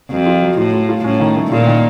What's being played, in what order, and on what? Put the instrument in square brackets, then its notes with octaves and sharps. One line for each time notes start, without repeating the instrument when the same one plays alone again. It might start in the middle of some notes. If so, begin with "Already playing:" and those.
[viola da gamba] F2 [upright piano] F#3
[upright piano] F4
F#3
[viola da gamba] A2 [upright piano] F4
[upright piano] F4
F4
[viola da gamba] A2 [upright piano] C#4
[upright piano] D#3
A3
[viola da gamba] A#2 [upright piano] F4
[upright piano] D#3